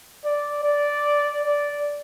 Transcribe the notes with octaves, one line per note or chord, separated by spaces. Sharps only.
D5
D5
D5